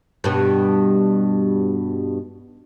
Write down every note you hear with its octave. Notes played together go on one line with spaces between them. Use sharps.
G2 B2